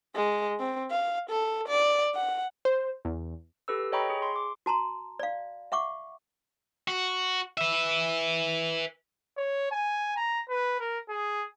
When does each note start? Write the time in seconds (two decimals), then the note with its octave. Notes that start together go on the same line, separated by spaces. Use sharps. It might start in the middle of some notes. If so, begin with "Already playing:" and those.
0.15 G#3
0.60 C4
0.91 F5
1.30 A4
1.68 D5
2.15 F#5
2.65 C5
3.05 E2
3.68 G4 A4 B4 E6
3.92 C#5 D#5 G5 A#5 B5 C#6
4.10 G#4
4.22 C6
4.36 D6
4.66 F#4 A5 A#5 C6
5.20 D5 F5
5.72 E5 F#5 C#6 D6
6.88 F#4
7.57 B4 E5
9.37 C#5
9.71 G#5
10.16 A#5
10.49 B4
10.80 A#4
11.09 G#4